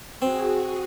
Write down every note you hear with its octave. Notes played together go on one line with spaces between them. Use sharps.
C4 F#4 G#4